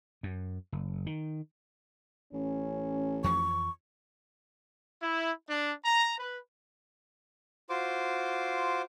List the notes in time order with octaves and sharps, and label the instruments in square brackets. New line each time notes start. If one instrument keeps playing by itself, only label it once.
[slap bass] F#2
F#1
D#3
[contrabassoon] A1 [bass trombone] C#4
[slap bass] F2 E3 F3 [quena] C#6
[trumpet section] E4
D4
A#5
B4
[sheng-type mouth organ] F4 F#4 C5 C6 D6